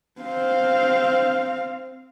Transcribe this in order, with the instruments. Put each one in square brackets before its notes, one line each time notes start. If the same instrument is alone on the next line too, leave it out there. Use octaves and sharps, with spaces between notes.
[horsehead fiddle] C4 F5